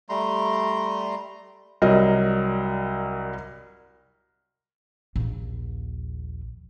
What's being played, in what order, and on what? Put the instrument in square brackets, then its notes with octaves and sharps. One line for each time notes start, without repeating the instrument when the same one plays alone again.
[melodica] G3 A3 A#5 C6
[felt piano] C2 F#3 G3 A#4 D#5
[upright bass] A#1 D#2